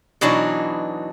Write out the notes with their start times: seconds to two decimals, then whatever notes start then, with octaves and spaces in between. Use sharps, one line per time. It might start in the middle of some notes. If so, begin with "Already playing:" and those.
0.21 B2 E3 F#3 D4 D#4